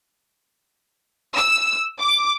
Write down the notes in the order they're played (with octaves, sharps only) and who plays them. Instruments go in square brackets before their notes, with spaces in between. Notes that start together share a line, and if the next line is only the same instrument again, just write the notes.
[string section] E6
D6